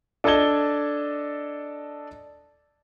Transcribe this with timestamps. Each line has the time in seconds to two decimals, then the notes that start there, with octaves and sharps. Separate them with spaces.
0.24 D4 A4 D#5 A5 G#6 G7